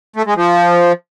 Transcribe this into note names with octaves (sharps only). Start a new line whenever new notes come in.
A3
G#3
F3